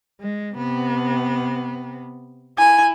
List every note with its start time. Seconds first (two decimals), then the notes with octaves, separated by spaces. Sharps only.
0.21 G#3
0.56 C3 B3
2.58 E4 G#5